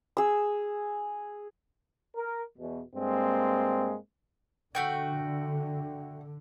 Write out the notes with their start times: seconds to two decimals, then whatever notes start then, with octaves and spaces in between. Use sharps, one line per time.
0.17 G#4 E6
2.16 A#4
2.58 E2 B2
2.95 G2 G#3 A#3 C4
4.75 D3 A3 F#4 G5